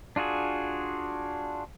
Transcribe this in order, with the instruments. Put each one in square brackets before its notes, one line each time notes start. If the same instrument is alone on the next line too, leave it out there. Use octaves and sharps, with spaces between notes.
[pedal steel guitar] D4 F4 F#4 G#4